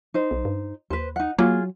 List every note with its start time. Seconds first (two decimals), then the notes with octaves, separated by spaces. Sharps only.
0.14 D#4 C5
0.31 B1
0.45 G2
0.90 D#2 B4 C5
1.16 D#4 F#5
1.38 F#3 A#3 F4 G#4